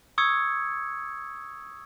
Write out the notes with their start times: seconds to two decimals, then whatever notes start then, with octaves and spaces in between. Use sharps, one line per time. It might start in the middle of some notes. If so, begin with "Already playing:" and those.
0.18 C#6 D#6 E6 G#6 C#7